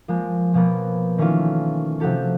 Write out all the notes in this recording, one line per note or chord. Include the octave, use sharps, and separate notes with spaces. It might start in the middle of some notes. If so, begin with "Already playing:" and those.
F3 G#3 A#3
B2 F3 A#3 B3
D#3 E3 A3 C#4 F4
C3 F3 F#4 G4 A4